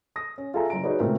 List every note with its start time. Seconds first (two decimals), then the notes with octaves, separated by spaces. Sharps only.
0.16 D#6 A#6
0.38 C#4
0.54 F4 G#4 A4 E5 G#5 A#5
0.70 F#1 A#5 D7
0.83 D#4 F#4 G#4 B4 C#5 D5
1.00 A#2 C#3 G#3 A3 C4 A#4